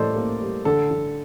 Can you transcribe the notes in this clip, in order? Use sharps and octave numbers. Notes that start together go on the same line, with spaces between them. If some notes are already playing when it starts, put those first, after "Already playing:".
Already playing: A2 G3 A#3 A4 C5 D5 D#5
A#3
G3
D3 A4
D3